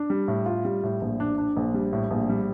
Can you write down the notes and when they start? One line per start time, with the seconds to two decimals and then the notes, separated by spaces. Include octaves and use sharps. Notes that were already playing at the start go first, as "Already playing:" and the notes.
Already playing: D4
0.10 G3
0.28 A2
0.46 F4
0.65 G3
0.83 A2
1.02 A#1
1.20 D4
1.38 D4
1.56 A#1
1.74 G3
1.93 A2
2.11 A#1
2.29 G3